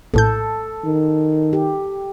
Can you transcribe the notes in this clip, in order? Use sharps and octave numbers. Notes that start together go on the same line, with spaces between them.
A#1 A2 A4 G6
D#3
G4